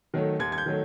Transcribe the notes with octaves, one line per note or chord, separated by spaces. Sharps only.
D#3 F#3 A3
D#2 G#6
G#6
G6
D#3 F#3 A3